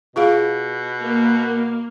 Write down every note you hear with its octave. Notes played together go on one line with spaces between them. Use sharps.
B2 F4 G#4 F5
A#3